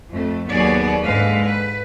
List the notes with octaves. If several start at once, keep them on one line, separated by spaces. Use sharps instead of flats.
F2 A3
D#2 F#3 B3 G#4 C#5 D5
G#2 D3 G#3 B4 F5
B4